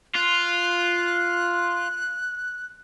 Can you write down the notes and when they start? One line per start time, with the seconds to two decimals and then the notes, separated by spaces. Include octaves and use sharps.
0.15 F4 F#6